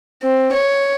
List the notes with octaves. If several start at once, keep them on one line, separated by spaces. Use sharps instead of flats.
C4
C#5